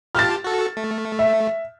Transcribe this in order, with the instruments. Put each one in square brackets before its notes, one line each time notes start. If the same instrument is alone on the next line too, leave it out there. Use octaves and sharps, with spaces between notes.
[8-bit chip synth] F4 G4 A5 [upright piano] F6 A6
[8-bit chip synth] F#4 A4
A3
[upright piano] E5